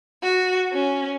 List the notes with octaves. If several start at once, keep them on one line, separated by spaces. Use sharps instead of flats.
F#4
C#4